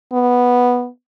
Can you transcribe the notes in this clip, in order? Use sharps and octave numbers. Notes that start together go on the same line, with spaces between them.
B3